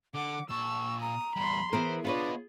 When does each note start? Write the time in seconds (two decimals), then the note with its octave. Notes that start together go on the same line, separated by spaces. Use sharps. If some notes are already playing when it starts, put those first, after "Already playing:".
0.15 D3 F#5 D6
0.50 A#2 A5 C#6 E6
1.01 A#5 D#6
1.36 E2 G3 B5 C6
1.73 E3 B3 G#4 A#4 C5
2.05 B3 D4 F4 B4 C#5 D#5